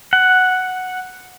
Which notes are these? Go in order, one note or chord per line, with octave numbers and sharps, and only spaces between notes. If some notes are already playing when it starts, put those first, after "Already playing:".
F#5